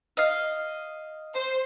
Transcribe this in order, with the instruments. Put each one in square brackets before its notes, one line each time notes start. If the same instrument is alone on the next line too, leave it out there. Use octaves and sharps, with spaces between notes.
[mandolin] D#5 F5
[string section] C5